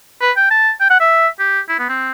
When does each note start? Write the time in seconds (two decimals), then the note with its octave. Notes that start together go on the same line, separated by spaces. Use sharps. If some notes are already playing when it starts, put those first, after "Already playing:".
0.21 B4
0.37 G5
0.51 A5
0.80 G5
0.90 F#5
1.00 E5
1.39 G4
1.69 E4
1.79 B3
1.89 C4